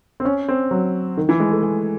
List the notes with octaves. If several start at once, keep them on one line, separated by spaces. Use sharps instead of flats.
C4
C#4
C4
F#3
D#3
E3
G#3
A3
G#3